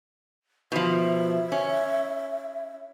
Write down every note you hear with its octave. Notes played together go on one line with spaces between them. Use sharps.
B2 F3 E5
C#4